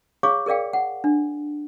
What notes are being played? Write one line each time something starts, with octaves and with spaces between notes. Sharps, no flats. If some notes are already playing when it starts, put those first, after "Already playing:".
G#4 C#5 F5 C#6 D6
G#4 A#4 D5 F5 G5
F#5
D4